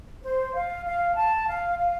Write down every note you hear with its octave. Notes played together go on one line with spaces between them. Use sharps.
C5
F5
F5
A5
F5
F5